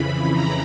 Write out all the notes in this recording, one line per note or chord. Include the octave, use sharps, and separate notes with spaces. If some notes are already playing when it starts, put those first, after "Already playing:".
Already playing: F2 C#3 E3 B5
A#5